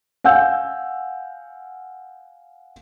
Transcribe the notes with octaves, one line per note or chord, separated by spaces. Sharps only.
F5 F#5 G#5 E6 G6